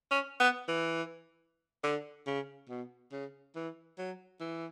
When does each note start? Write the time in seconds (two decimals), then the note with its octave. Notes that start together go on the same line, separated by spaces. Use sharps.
0.11 C#4
0.40 B3
0.68 E3
1.83 D3
2.26 C#3
2.69 B2
3.12 C#3
3.55 E3
3.98 F#3
4.41 E3